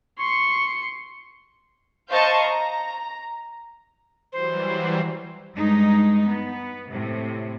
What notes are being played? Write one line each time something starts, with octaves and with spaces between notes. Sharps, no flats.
C6 C#6 C#7
C5 D#5 F5 A5 C#6 G6
A#5
E3 F#3 G3 C5
G2 G#3 D#4
B3
A2 C3